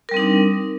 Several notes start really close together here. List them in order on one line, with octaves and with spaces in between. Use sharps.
A#4 G3 C4 D#4 D4